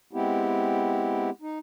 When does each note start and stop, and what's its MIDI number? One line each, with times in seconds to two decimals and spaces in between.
0.13 1.30 56
0.13 1.30 59
0.13 1.30 60
0.13 1.30 64
0.13 1.30 67
1.42 1.59 63